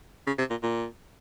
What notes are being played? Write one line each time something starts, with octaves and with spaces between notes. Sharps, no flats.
C#3
C3
A#2
A#2